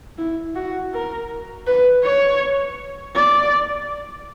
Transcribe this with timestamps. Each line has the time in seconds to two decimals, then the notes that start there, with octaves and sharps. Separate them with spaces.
0.18 E4
0.55 F#4
0.93 A#4
1.67 B4
2.03 C#5
3.15 D5